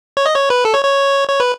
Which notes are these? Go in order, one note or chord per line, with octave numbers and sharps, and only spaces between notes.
C#5
D#5
C#5
B4
A4
C#5
C#5
C#5
B4